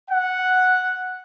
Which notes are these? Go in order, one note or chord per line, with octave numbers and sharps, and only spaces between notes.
F#5